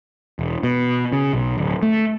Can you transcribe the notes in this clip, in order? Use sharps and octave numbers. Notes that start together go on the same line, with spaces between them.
E1
B2
C#3
B1
D1
A3